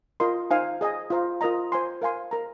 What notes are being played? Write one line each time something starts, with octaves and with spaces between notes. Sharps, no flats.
F4 A#4 D#5 C6
D#4 C5 F5 G#5
G#4 D#5 G#5
F4 C5 F5 A#5
F4 A#4 D#5 A#5
C5 G#5 C6
A#4 F5 G#5 C6
A#4 D#5 A#5